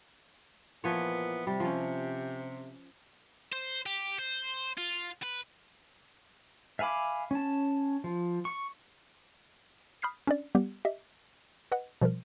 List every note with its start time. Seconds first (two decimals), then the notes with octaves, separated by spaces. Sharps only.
0.84 A#2 E3 F3 B3 C#5
1.47 C3 G3
1.60 F3 C#4
3.53 C5
3.86 G4
4.19 C5
4.77 F4
5.22 B4
6.79 E5 F5 G#5 B5 D6
7.31 C#4 A5
8.04 F3
8.45 C#6
10.02 B5 D#6 F6 G6 B6 C7
10.27 C#4 D4 D5
10.55 G3 B3 G4
10.85 G4 D#5 E5
11.72 B4 D#5 F#5
12.01 B2 F3 G3 A#4